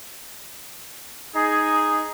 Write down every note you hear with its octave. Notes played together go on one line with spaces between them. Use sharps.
D#4 G#4